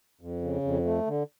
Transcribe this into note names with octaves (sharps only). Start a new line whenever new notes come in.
F2
C#3
F2
A3
D3